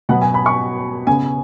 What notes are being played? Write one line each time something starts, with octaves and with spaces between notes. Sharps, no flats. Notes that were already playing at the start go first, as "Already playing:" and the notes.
B2 F#3 B3 F#5
G#5
B5
C#6
C#3 B3 G#5